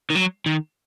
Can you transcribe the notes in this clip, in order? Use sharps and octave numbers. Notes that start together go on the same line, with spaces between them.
D#3
F#3
D#3